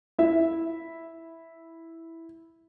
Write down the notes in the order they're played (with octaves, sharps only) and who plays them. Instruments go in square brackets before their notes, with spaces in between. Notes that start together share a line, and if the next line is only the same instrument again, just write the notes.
[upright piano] E4 E5